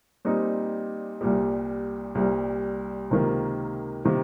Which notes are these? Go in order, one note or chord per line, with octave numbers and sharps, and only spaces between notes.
A#2 G3 C4 D#4
C2 A#2 G3
C2 A#2 G3
C#2 C3 D#3 A#3
C3 D#3 A#3